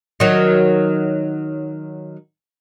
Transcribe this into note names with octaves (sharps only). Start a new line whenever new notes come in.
D#3 F#3